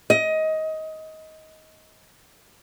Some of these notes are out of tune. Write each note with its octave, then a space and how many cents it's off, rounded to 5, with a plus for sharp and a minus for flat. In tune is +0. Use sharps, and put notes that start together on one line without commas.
D#5 +20